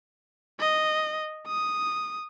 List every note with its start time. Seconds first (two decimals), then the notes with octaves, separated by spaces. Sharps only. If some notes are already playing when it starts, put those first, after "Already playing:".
0.60 D#5
1.47 D#6